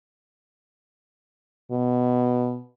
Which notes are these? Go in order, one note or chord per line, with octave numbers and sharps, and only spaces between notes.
B2